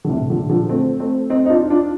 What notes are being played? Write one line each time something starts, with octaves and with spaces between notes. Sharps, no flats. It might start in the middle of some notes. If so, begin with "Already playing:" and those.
D3
A2 C3
A#2 D3
D3 F3
A3 C4
A3 C4
C4 D#4
D#4
D4 F4
D4 F4